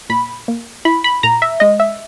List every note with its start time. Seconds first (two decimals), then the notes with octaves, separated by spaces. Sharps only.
0.10 A#2 B5
0.48 A#3
0.85 E4 B5
1.04 B5
1.23 A#2 A#5
1.42 E5
1.60 G#3 D#5
1.80 E5